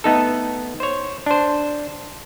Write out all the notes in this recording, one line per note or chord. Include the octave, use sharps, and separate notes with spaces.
A3 B3 D#4 A4
C5 C#5
D4 C5